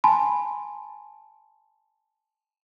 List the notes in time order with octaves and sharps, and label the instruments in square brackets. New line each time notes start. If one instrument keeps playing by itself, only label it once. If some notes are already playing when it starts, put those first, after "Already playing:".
[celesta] G#5 A5 B5 C6